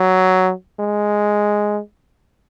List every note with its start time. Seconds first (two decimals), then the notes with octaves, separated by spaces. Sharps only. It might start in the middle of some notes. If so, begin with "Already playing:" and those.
Already playing: F#3
0.80 G#3